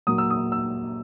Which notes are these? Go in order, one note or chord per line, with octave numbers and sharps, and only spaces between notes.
A#2 F#3 A#3 D#6
E6
D#6
E6